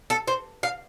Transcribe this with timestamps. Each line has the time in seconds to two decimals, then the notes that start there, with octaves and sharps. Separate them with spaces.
0.10 A4
0.27 C5
0.63 F5